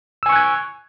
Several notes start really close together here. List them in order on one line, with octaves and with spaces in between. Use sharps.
E6 G#5 C#6 F#6 G#6